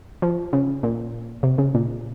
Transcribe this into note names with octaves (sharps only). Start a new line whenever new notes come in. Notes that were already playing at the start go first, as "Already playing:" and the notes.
F3
C#3
A#2
C3
C#3
A#2